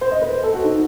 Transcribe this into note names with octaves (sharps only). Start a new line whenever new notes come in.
C5
D#5
B4
C5
A4
F#4
D#4